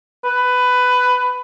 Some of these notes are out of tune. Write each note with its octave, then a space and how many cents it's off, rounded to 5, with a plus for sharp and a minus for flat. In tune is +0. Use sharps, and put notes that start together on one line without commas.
B4 +15